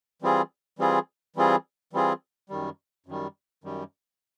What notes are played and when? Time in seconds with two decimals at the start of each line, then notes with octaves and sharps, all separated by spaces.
0.22 E3 G3 C4 F4 G#4
0.79 E3 G3 C4 F4 G#4
1.36 E3 G3 C4 F4 G#4
1.93 E3 G3 C4 F4 G#4
2.49 F#2 D#3 G3
3.07 F#2 D#3 G3
3.64 F#2 D#3 G3